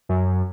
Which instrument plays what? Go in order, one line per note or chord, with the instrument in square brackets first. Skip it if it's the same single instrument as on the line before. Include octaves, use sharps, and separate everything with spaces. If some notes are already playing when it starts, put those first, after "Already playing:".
[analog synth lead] F#2